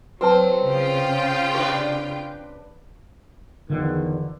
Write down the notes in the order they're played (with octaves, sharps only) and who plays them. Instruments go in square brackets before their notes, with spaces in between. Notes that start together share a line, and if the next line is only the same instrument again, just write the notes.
[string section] F#3 [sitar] C4 [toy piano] F#4 B4 A5
[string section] C#3 F4 G5
[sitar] D4 B4 [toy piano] G4
[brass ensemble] E2 D#3 [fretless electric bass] D3 F3